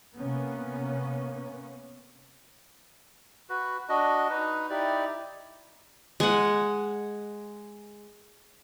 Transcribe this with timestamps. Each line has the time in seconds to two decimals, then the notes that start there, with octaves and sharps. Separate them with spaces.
0.18 C3 A#3 B3 C#4
3.50 F#4 B4
3.89 D4 F#4 D#5
4.30 D#4 B4
4.70 D#4 E4 G4 D5
6.20 G#3 F#5